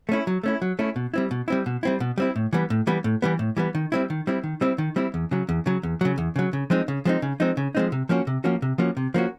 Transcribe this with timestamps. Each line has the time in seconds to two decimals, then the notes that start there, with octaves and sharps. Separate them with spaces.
0.09 A3 C#4 E4
0.27 F#3
0.43 A3 C#4 E4
0.62 F#3
0.79 A3 C#4 E4
0.96 B2
1.14 G3 C4 E4
1.31 B2
1.48 G3 C4 E4
1.66 B2
1.83 G3 C4 E4
2.00 B2
2.18 G3 C4 E4
2.36 A2
2.53 E3 G3 B3
2.70 A2
2.87 E3 G3 B3
3.04 A2
3.22 E3 G3 B3
3.39 A2
3.57 E3 G3 B3
3.75 D#3
3.92 G3 C4 E4
4.10 D#3
4.27 G3 C4 E4
4.44 D#3
4.61 G3 C4 E4
4.78 D#3
4.96 G3 C4 E4
5.14 E2
5.31 C#3 F#3
5.49 E2
5.66 C#3 F#3
5.83 E2
6.01 C#3 F#3
6.18 E2
6.36 C#3 F#3
6.53 C#3
6.70 F3 G#3 C4 D#4
6.88 C#3
7.05 F3 G#3 C4 D#4
7.22 C#3
7.40 F3 G#3 C4 D#4
7.57 C#3
7.75 F3 G#3 C4 D#4
7.92 C3
8.09 F3 A#3 C#4 F#4
8.27 C3
8.44 F3 A#3 C#4 F#4
8.62 C3
8.78 F3 A#3 C#4 F#4
8.97 C3
9.14 F3 A#3 C#4 F#4